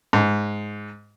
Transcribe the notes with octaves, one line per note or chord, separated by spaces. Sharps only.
G#2